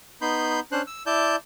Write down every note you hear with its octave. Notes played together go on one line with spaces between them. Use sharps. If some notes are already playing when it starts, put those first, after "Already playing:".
B3 D#4 B5 C6 G6
C#4 D4 C5 C6 F#6
E6
E4 D5 A5 G6